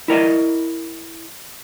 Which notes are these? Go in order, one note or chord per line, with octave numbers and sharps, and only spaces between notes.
E4 A#4 D5 D#5